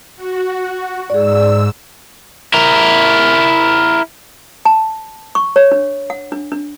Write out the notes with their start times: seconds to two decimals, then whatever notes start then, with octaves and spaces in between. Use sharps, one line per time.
0.15 F#4
1.10 G#2 G#4 D5 E6
2.54 E4 A#4
4.65 A5
5.35 C#6
5.56 C#5
5.72 D4
6.10 F#5
6.32 D4
6.52 D4